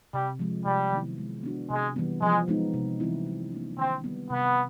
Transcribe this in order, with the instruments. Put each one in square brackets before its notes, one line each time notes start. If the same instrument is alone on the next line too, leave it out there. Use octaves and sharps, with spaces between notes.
[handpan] C3 [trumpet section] G3
[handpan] F3 G#3
[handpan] C3 [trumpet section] G3
[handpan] D#3 F#3 B3 E4
G#3
B3 D4 F#4
[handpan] C3 [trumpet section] G#3
[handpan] E3 G3 B3
[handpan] F3 [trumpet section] G#3
[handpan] G#3 B3 D#4
C3
E3 G3 C4 E4
F#3
A#3 D4
[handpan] D#3 [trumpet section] C4
[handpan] G3 B3
[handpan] C3 [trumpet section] B3